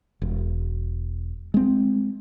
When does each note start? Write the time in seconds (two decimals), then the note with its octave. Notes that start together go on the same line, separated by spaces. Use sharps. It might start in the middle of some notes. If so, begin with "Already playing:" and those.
0.22 E1
1.54 G#3 C4